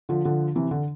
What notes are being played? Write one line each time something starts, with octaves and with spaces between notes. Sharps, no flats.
D3 F3
D3 F3
C3 E3
D3